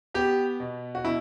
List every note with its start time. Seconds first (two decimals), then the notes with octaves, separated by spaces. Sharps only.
0.14 B3 G4
0.60 B2
0.95 F#4
1.05 B2 E4